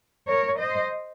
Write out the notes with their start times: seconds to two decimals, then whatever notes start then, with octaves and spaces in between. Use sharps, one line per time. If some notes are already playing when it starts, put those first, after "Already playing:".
0.28 A#4 C#5
0.58 C5 D#5